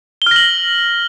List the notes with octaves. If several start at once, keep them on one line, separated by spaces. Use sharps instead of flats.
F6 A#6 F#7 G7